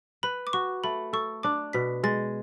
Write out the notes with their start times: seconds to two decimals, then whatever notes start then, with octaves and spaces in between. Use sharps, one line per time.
0.23 B4 B5
0.47 D6
0.53 F#4 C#6
0.84 A3 B5
1.13 A4 C#6
1.43 D4 D6
1.73 B2 B6
2.03 G#3 A6